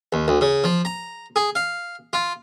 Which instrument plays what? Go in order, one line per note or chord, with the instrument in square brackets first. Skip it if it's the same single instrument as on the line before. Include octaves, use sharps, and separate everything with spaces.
[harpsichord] D#2
D2
C#3
F3
A#5
G#4
F5
F4